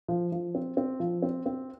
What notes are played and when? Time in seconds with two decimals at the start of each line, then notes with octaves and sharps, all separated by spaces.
0.08 F3
0.32 F3
0.55 C4
0.77 C4
1.00 F3
1.22 C4
1.46 C4